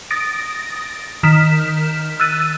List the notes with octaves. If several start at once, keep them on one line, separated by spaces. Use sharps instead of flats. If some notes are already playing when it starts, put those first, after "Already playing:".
D#6 A6 A#6 D7
D#3 F6 B6 E7
E6 F#6 A6 D#7